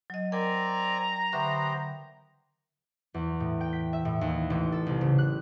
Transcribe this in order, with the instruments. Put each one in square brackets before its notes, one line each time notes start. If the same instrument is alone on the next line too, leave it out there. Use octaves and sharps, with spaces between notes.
[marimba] F#3 D#5
[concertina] C4 D5 G#5 [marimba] A#4 G5 [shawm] A#5
[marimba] D3 E5 C#6 [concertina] B3 G4 C5
[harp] E2
A2
G5
B6
E5
A2
D#2
A1
A4
C2
C#3
F#6